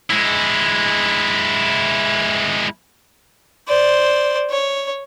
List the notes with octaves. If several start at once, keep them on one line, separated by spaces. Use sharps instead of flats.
G#3 E4
C5 D5
C#5